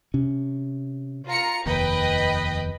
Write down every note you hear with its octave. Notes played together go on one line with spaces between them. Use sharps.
C3 C#4
F4 A#5 C#7
F1 D#2 B4 D#5 G5